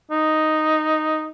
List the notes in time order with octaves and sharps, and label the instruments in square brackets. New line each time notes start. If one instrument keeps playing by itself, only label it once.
[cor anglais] D#4